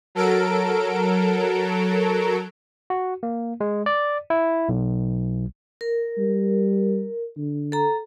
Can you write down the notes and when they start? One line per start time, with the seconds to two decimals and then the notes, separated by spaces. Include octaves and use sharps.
0.15 F#3 A4 A#4 D7
2.90 F#4
3.23 A#3
3.61 G#3
3.86 D5
4.30 E4
4.69 B1
5.81 A#4
6.18 G3
7.36 D3
7.72 A4 A#5